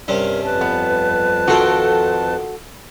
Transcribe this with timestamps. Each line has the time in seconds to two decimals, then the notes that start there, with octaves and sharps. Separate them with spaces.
0.08 G2 C3 C#4 A#4
0.45 F2 B4 A5
0.61 B3
1.48 D#3 F4 F#4 A4 G5